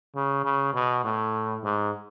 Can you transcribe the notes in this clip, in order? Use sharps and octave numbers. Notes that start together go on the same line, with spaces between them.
C#3
C#3
B2
A2
G#2